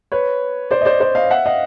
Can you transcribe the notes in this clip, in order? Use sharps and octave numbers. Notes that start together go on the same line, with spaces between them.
B4 C#5
C5 D5
D#5
C5 D5
C5 D5
D#5 F5
E5 F#5
D#5 F5